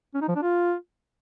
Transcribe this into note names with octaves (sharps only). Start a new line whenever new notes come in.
C#4
D#4
F3
D4
F4